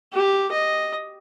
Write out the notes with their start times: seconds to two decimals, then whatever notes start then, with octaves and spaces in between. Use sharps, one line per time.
0.13 G4
0.51 D#5